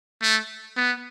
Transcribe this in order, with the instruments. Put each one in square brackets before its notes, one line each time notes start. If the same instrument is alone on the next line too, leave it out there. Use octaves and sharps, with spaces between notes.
[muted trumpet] A3
B3